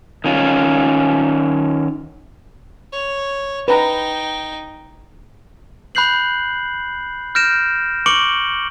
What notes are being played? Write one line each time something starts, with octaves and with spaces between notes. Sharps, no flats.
D#3 C#4 F4
C#5
D#4 B4 G5 A#5
B5 F#6 G6 C7 F#7
F6 G6 A#6 D7 E7
C#6 D6 C#7 D7 F#7 G7